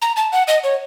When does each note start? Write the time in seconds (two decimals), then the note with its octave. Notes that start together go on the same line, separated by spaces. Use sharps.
0.02 A#5
0.16 A5
0.32 F#5
0.48 D#5
0.64 C#5